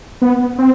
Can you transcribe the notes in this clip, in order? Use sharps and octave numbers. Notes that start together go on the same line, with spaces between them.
B3
C4